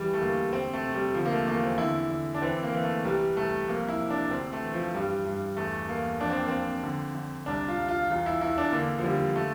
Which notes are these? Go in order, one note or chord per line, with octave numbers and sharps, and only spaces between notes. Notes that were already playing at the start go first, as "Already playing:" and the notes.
Already playing: E2 E3 G3
A3
D2 A#3
D2 C4
A3
C3
G3
D3 F3
A#3
A3
E2 A#3
C4
D3 E4
D3
D4
E3 C4
A#3
E3
A3
C2 G3
C2 A3
F2 A#3
E4
C3
D4
D2 C4
A3
E3
F3
G2 G3
G2
E2 A3
E2 A#3
F2 D4
C4
A#3
F2 C4
D3
D3
C2 D4
F4
C2
F4
E2 F4
E4
E2 E4
D4
D3 A#3
F3
D3 G3
A3